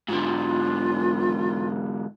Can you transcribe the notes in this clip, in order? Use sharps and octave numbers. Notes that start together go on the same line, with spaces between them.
G#2 D3 F4